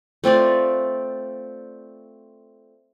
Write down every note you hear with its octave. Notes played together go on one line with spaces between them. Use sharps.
A3 C4 F4 D5